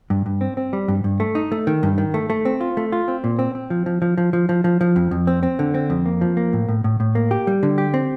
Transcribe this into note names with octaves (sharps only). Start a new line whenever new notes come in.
G2
G2
C4
C4
G3
G2
G2
A3
D#4
A3
D#3
G2
D#3
A3
A3
C4
F4
A3
F4
C4
A#2
C4
C4
F3
F3
F3
F3
F3
F3
F3
F3
F2
F2
C4
C4
D3
C4
F2
A#3
F3
A#3
A2
A2
A2
A2
A#3
G4
G3
D3
G4
C4